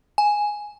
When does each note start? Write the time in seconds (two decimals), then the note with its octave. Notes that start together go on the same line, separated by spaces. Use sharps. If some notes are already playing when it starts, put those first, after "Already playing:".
0.18 G#5